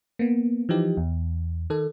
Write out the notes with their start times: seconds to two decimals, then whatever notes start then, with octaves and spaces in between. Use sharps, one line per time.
0.19 A#3 B3
0.69 E3 F3 D#4 G4
0.97 E2
1.70 D#3 A4